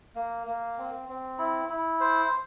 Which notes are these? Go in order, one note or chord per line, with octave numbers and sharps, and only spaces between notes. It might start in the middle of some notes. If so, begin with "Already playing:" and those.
A#3
A#3
C4
C4
E4
E4
C5